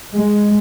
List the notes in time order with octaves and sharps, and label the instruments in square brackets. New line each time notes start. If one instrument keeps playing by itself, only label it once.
[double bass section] G#3